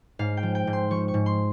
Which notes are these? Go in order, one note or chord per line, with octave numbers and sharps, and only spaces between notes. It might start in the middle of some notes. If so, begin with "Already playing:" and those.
G#2 F5
G5
F3
G5
G#2
C6
F3 C#6
C#6
G#2
C6